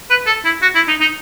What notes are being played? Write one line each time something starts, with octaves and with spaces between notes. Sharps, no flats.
B4
A4
E4
F#4
E4
D#4
D#4